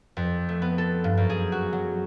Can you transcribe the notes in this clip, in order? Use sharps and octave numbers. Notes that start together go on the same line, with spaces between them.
F2
A3
B3
A4
G2
F#2
G#4
F#4
F#3